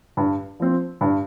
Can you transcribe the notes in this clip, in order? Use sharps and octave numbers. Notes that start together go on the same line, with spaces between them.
G2
F3 C4
G2